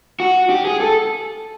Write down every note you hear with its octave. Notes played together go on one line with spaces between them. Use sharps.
F#4
G4
G#4
A4